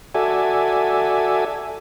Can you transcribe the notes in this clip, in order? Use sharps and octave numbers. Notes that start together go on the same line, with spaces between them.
F#4 A4 D5 E5 G#5